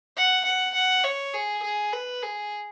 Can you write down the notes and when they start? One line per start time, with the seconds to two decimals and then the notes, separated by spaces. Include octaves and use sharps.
0.17 F#5
0.46 F#5
0.75 F#5
1.04 C#5
1.34 G#4
1.64 G#4
1.93 B4
2.22 G#4